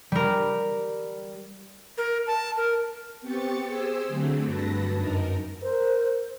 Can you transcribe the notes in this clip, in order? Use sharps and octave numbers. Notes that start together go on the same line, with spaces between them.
G3 A#4
A#4
A5
A#4
B3 C4 G4 C#6 A6 C#7
G4 G#4 C5 G#5 E6
D3 F#3 A3 C4
G2 F#3 B4 A5 A#6
F#2 D#4 A#4
A#4 C5